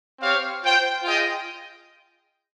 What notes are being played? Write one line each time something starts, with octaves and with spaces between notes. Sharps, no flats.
C4 G4 C#5 F5
F4 C5 G5
F4 G#4 D#5 G5